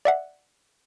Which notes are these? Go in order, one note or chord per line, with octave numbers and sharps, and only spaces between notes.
D5 E5 F#5